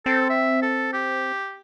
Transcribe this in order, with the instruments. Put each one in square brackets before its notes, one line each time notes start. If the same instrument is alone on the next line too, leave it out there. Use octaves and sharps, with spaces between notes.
[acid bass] C4 [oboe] A4
[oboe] E5
A4
G4